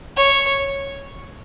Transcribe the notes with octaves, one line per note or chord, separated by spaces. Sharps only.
C#5